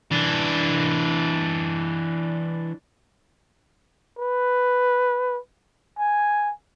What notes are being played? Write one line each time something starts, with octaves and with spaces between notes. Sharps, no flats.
E3 D4
B4
G#5